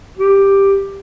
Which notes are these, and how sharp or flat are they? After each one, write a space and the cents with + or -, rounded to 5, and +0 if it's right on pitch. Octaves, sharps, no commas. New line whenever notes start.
G4 +5